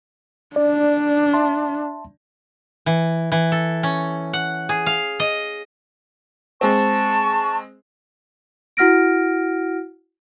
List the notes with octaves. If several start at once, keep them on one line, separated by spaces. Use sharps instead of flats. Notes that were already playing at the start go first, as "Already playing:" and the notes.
D4 D5
E5 A5 C6
E3
E3
A4
C#4
F#5
G#4
F5
D#5
G#3 C4 A5 C#6
E4 F#4 F#5 F6 A#6 D7